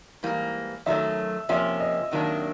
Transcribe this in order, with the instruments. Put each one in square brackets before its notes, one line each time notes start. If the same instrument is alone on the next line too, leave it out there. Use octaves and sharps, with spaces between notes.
[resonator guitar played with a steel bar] G#2 E3 G3 A#3
[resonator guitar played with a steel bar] F#2 D#3 F#3 A3 [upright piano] E5
[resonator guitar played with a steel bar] C3 F3 A#3 C#4 [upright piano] E5
[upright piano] D#5
[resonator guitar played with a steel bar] C3 D#3 F#3 A#3 D4